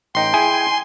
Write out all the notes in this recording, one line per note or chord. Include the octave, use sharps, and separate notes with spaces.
A1 D#4 G5 C6
E4 G#4 G#5